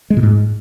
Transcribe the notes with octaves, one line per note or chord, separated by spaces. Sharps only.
G#3
A#2
G#2